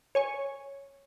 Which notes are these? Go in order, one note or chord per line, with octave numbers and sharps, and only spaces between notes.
C#5 G#5 C#6